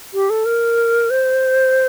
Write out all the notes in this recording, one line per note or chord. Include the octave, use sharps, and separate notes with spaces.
G4
A4
A#4
C5